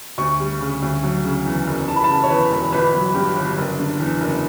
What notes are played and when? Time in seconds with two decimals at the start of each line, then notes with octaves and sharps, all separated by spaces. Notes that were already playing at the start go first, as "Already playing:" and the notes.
0.18 D2 C#6
0.40 G3
0.61 C#3
0.82 D2
1.03 F#3
1.24 C#3
1.45 E2
1.67 F#1
1.88 E3 A5
1.96 B5
2.04 A5
2.09 C#3
2.23 C#5
2.30 E2 B4
2.51 E1
2.72 G1 B4
2.94 F#3
3.14 G2 G4
3.36 G1
3.57 F#1
3.79 D3
4.00 E2
4.20 F#1